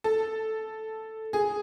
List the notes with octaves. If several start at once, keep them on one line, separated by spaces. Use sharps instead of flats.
A4
G#4